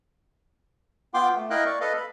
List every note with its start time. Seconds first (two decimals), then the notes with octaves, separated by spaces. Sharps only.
1.14 B3 F4 G5 C6 D6
1.35 A3
1.50 E4 A#4 D#5 F5 G5 F#6
1.66 D5 C#6
1.81 A4 B4 D#5 F5
1.97 B5